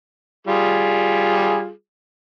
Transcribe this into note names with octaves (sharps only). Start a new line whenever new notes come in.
G3 F4 G#4